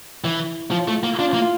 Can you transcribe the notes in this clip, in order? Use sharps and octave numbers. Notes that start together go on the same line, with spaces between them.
E3 E4
F3 F4
A3
A#3
D4 F4
A#3
E4
F4